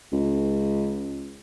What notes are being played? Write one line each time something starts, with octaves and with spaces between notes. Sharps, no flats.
C#2